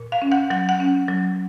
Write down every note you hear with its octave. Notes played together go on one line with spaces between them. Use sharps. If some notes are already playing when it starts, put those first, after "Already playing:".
Already playing: A#2
F5
C#4
F#5
F#3 F#5
F#5
C#4
F#3